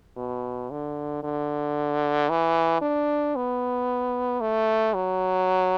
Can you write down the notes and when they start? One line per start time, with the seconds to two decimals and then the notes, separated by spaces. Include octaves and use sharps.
0.17 B2
0.70 D3
1.23 D3
2.29 E3
2.81 D4
3.36 B3
4.41 A3
4.94 F#3